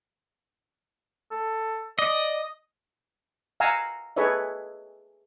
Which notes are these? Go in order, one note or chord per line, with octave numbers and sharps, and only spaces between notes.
A4
D5 D#5
F5 F#5 G#5 A#5 E6
G#4 A4 B4 C#5 D#5 E5